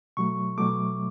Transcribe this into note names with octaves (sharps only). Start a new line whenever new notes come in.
B2 F#3 A3 C#6
B2 F#3 A3 D6